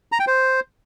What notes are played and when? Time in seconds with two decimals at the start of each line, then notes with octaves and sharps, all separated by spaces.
0.12 A#5
0.20 G5
0.27 C5